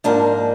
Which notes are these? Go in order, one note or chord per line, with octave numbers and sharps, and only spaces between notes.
G#2 F3 A#3 D4